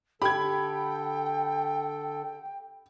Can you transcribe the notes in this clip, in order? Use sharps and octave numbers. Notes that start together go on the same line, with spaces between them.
D3 G4 A4 G5 B5 G#6